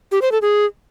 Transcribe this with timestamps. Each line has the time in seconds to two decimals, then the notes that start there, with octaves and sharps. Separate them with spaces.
0.12 G4
0.22 C5
0.32 A4
0.42 G#4